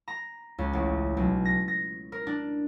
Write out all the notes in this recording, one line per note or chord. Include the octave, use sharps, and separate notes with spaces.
A#5
C#2
A1
B1
A#6
A#6
A#4
D4